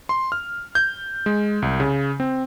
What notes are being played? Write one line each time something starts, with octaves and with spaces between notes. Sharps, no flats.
C6
F6
G6
G#3
C2
C#3
C4